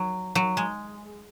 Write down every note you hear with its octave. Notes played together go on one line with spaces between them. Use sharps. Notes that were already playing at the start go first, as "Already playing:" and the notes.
Already playing: F#3
F#3
G#3